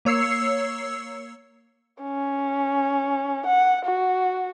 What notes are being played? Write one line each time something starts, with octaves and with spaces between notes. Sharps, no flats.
A#3 C#5 E6 C7 C#7
C#4
F#5
F#4